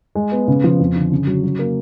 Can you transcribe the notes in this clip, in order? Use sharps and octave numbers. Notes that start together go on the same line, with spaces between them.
G#3
B3
C#3
F3
F2
D3
C#3
F#3
F#3
A#3